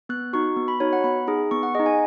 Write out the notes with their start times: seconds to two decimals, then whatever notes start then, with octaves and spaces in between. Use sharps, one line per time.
0.09 B3 F#6
0.33 D#4 F#4 C#6
0.57 B3
0.68 B5
0.80 D#4 F#4 C#5
0.93 F#5
1.04 B3 B5
1.28 D#4 G#4
1.51 B3 C#6
1.63 F#5
1.74 G#4 D#5
1.79 D#4
1.86 G#5